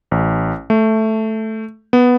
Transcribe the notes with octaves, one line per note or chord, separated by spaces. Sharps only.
A1
A3
B3